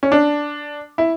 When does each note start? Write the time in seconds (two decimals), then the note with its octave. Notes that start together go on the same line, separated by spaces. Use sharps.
0.03 C#4
0.12 D4
0.98 E4